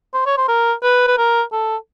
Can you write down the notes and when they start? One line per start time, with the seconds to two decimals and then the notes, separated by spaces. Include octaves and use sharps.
0.14 C5
0.26 C#5
0.37 C5
0.49 A#4
0.83 B4
1.07 B4
1.18 A#4
1.52 A4